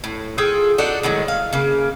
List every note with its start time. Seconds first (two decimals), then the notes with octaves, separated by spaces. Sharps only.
0.04 A2
0.38 F4 G#4 A4 G5
0.78 D4 D#4 F#4 A4
1.03 A2 D#3 F#3 G#3
1.28 F5
1.53 C#3 A#3